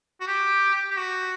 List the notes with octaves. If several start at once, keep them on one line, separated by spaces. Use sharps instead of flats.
F#4
G4
G4
F#4